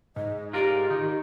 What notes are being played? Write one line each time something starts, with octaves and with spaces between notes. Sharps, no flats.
G#2 D#5
F4 G4 A#4 D5
D#3 D#4